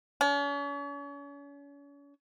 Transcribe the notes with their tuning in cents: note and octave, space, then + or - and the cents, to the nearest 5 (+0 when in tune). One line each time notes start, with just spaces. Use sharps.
C#4 +40